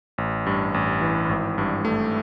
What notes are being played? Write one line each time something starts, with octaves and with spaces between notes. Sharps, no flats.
A1
G2
A1
E3
G#1
G2
A3